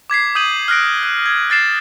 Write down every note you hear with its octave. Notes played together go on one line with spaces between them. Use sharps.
D6 G#6 B6 C7
D#6 G6 D#7 F#7
F6 F#6 A#6 D7
F#6
G#6
F6 A6 C7 E7